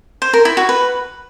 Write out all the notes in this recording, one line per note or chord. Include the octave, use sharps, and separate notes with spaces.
C5
A#4
E4
F#4
B4